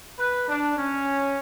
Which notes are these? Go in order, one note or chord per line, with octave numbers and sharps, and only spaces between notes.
B4
D4
C#4